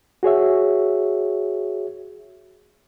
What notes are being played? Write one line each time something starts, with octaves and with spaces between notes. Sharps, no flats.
F#4 G#4 C#5 E5